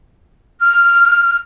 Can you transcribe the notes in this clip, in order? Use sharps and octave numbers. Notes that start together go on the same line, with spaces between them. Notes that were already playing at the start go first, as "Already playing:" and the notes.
F6